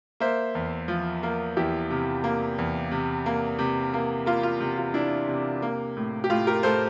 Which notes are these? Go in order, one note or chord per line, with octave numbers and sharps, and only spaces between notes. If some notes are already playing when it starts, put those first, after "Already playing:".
A#3 C5 E5
E2
F3
A#3
E2 E4 G4
C3
A#3
E2
C3
A#3
C3
A#3
A#3 F4
F4
C3
F4
D4 E4
C3
A#3
A2
G4
A2 F4
G4 A#4
A2 A4 C5